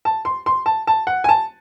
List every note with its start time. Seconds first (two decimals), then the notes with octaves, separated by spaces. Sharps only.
0.05 A5
0.25 C6
0.46 C6
0.66 A5
0.87 A5
1.07 F#5
1.24 G#5
1.29 A5